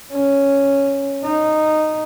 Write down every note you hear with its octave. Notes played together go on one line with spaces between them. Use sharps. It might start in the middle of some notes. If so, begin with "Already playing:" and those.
C#4
D#4